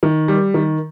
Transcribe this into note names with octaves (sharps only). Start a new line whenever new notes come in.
D#3
G3
D#3